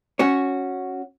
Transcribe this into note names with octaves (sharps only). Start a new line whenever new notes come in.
C#4 F#4 C#5